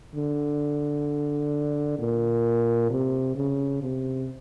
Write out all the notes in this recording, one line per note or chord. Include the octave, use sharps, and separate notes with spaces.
D3
A#2
C3
C#3
C3